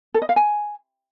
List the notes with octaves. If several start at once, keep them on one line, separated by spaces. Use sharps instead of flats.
A4
D#5
F5
G#5